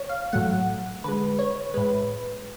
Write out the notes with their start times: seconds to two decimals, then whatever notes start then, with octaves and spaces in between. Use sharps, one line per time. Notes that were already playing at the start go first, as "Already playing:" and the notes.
Already playing: C#5
0.09 F5
0.33 A2 F#3 A3 F#5
1.04 D3 G#3 B4
1.39 C#5
1.74 A2 G#3 B4